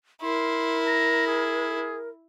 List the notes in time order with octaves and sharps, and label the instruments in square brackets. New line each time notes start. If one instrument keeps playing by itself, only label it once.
[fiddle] E4 [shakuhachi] A#4 [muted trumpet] C6
[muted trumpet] A#5
G#4